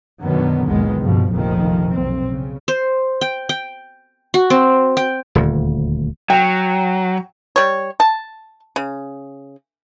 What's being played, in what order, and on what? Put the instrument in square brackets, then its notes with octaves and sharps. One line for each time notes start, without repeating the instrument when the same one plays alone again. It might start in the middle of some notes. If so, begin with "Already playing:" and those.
[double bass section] F#2 B2 D3 D#3 F#3 B3
F#1 C#2 A#2 D#3 G#3 B3
C#2 G2 B2 F3
F1 A#1 F2 A#2 D#3 F3
B1 C4
C#3
[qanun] C5
G5
G5
F#4
C4
G5
[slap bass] D#1 D2
[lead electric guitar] F#3 [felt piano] G5
[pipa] G3 C#5
A5
C#3